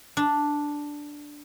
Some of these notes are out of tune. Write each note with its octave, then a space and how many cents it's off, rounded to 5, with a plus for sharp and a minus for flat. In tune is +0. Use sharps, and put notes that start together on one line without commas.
D4 +0